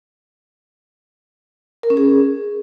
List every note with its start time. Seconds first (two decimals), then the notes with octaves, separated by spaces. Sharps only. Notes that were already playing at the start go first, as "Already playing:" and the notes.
1.83 A#4
1.90 C#4
1.97 G#4